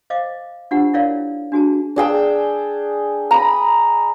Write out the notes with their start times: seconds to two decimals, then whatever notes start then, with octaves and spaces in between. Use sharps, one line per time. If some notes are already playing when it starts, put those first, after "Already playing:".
0.10 C5 D#5 F5 D6
0.71 D4 F4 G4 C5 F#5
0.94 E4 A#4 C#5 D5 F5
1.52 D4 F#4 G#4 A5
1.96 D4 G#4 G5 E6
3.31 A#5 B5 D#6